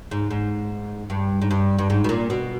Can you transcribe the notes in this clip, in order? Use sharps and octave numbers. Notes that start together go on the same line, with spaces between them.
G#2
G#2
G2
G#2
G2
G2
G#2
B2
A#2
B2